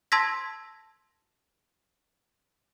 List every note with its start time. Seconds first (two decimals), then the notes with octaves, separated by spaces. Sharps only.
0.12 A5 C6 E6 G#6 A#6 B6